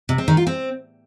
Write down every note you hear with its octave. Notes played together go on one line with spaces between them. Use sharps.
C3
C4
D#3
F4
C4